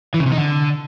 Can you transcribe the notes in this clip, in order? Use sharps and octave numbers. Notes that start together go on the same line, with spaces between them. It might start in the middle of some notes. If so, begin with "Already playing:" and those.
E3
C#3
C3
D#4
D3